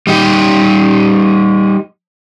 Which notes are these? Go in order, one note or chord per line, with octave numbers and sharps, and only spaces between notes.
G3 D#4 G4